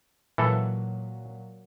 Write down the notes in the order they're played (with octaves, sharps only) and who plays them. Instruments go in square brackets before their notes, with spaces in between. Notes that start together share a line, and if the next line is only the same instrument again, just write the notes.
[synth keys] A#2 F#3 [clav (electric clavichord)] E3 A4